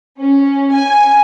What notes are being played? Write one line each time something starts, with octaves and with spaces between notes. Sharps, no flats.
C#4
G#5